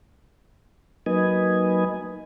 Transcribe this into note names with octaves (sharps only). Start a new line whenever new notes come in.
F#3 A#3 D#4 B4 D#5 G#5